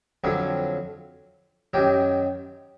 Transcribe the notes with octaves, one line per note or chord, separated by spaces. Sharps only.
F2 D3 F#3 F#4
F#2 D#3 F#3 G4